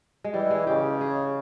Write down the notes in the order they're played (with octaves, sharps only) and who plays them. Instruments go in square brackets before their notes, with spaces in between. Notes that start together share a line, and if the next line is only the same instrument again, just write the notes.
[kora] G#3
[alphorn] E3 [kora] G3
[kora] G#3
[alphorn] C#3 [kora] G4
[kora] G#4